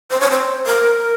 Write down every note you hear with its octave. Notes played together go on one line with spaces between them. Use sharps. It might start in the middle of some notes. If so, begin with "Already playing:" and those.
C5
C#5
C5
A#4